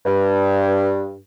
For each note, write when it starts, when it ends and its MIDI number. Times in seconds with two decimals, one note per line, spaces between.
0.06 1.16 43